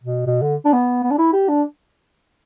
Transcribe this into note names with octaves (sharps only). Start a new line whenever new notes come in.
B2
B2
D3
D4
B3
B3
D4
E4
G4
D4